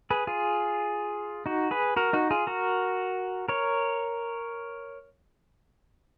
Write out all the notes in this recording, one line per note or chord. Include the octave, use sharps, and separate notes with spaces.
G#4 B4
F4 G#4
D#4 F#4
G#4 B4
F#4 A#4
D#4 F#4
F4 G#4
F#4 A#4
A#4 C#5